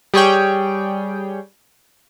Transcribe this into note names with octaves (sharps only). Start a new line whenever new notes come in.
G3 G#4 C#5 G5